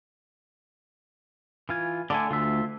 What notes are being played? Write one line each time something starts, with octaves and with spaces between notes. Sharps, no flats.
E3 F4 G#5
D3 A3 D5 G#5
D2 F4 E5